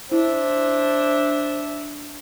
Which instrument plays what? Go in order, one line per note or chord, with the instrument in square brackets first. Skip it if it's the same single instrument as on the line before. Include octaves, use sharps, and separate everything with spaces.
[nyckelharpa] D4 E5 [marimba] E4 [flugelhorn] C5